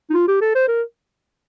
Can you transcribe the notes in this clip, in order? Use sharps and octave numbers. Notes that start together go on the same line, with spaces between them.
D#4
F4
G4
A4
C5
A#4